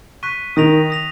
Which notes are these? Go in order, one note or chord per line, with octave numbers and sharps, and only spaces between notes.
C#6 F#6 B6 D#7
D#3 D#6 A#6 F7
D#6 A#6 F7